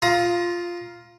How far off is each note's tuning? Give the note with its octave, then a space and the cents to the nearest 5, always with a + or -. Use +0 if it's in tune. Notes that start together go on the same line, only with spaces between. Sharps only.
F4 +0 A#5 +25 D#6 +20